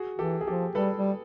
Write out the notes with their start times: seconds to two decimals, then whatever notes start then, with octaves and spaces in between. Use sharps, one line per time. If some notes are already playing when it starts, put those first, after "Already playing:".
Already playing: F#4 G#4
0.19 E3 G4 A4
0.41 G#4
0.47 F3 G4 A4
0.75 G3 A4 B4
0.97 G3